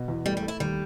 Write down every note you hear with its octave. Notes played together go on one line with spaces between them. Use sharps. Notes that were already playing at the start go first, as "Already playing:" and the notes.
Already playing: B2
E2
G3 A3
G3
A3
E4
D#2 G3